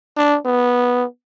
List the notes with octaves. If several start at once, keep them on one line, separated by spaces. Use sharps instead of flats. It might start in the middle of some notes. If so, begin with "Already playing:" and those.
D4
B3